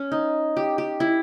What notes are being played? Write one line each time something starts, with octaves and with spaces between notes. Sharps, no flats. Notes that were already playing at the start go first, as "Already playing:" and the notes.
Already playing: C#4
D#4
G4
G4
E4